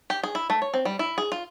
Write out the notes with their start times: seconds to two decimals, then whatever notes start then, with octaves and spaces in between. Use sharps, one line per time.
0.10 G4
0.23 G#4
0.35 E4
0.50 A3
0.62 C#5
0.74 C4
0.85 G3
0.99 E4
1.18 G#4
1.32 F4